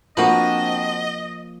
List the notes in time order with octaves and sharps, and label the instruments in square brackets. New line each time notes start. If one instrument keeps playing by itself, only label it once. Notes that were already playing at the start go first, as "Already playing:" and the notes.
[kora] F3 A#3 [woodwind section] C4 D4 [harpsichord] F#4 B4 [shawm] D#5